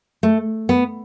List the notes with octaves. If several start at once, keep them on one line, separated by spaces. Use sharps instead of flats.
A3
B3